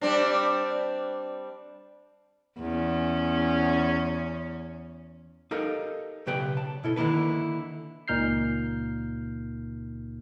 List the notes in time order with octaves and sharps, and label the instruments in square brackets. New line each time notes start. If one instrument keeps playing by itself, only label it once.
[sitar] G3 C4 D4
[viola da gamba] E2 C#4
[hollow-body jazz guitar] D#4 G4 A4 A#4 D#5 F5
B1 C#3 G4 B4 D5 G5
A5
B2 E4 A4
D3 D#3 A#3 E4 B4
[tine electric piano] C#2 A#2 D#4 F6 G6 C7